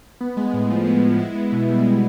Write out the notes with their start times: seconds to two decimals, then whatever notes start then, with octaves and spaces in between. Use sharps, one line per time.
0.21 B3
0.37 G#3
0.54 A2
0.70 F3
0.86 B3
1.02 G#3
1.20 E4
1.35 B3
1.52 B2
1.69 G3
1.84 E4